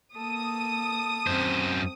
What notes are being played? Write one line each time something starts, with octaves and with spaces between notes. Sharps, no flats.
A#3 A4 D#6
F#2 C4 C5